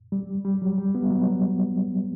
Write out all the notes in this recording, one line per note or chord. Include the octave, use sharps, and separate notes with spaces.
G3
G3
F#3
G3
B3
F#3